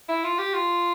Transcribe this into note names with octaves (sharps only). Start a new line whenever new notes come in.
E4
F4
G4
F4